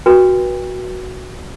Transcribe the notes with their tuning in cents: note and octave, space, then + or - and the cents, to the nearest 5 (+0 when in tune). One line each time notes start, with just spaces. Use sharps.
F#4 +0 B4 -35 G5 +35